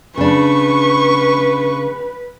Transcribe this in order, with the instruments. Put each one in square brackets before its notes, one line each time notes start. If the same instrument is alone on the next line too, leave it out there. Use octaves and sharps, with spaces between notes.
[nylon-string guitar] C#3 D4 [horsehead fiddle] B4 [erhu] C#6